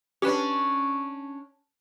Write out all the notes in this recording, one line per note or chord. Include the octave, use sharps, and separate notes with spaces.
C#4 D4 G4 B4